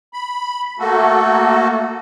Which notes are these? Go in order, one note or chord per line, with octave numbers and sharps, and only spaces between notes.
B5
A3 A#3 F#4 A4